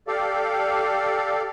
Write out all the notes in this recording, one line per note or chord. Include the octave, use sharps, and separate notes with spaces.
G4 A4 D5 F5